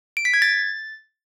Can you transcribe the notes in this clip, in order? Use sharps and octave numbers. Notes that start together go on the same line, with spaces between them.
D7
B6
G#6
A6